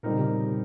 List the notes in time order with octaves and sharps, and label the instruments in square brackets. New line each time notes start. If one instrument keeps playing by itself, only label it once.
[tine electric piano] A#2 [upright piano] G3 C4 D#4 A#4
[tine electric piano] C#3
C3